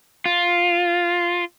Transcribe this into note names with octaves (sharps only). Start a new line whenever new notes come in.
F4